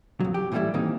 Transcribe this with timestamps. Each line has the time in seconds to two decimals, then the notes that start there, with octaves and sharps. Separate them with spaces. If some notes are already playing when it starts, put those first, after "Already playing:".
0.20 F2 F#3
0.34 G4
0.52 A2 E3 F3 G3 A3 E4
0.74 D#3 E3 A#3 C4 D#4